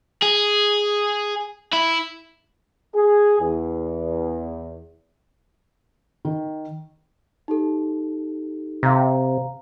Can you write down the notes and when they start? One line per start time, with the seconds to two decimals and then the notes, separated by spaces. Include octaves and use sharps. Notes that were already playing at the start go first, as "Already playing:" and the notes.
0.23 G#4
1.73 E4
2.95 G#4
3.40 E2
6.25 D#3
7.48 D#4 G4 A4
8.83 C3 F5 A#5